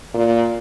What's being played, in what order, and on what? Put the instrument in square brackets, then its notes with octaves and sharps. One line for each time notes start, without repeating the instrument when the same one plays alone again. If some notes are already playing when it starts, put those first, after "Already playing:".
[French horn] A#2